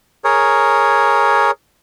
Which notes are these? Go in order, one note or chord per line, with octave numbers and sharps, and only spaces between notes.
G#4 A#4 C#5